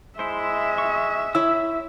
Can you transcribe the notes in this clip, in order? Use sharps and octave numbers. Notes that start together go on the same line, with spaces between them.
G#3 E4 C5 E5
C#6
E4 C#5 E6